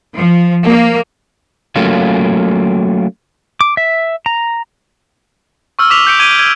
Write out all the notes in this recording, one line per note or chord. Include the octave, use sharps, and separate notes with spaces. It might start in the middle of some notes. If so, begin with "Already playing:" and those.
F3
A#3
F#3 A3 A#3 C#4 F4
D6
E5
A#5
C#6 E6 F6
D6 B6 F7
G6 C#7 D7
D6 G#6 D7 D#7 G7
G#6